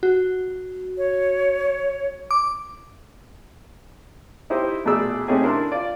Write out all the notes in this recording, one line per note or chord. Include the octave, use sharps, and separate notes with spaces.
F#4
C#5
D6
D#4 E4 G4 C5 D#5
A#1 B2 A3 G#4 D5 E6
C3 A3 C#4 D#4 G4 G#4
D4 E4 A#4 A5 C6
F4 D5